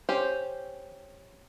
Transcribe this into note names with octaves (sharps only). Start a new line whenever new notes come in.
C#4 G4 C5